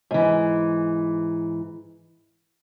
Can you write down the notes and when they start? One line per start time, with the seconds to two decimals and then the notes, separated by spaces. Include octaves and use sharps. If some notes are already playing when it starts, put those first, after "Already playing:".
0.11 G#2 E3